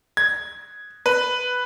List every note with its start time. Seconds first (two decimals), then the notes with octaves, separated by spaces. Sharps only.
0.17 G#6
1.06 B4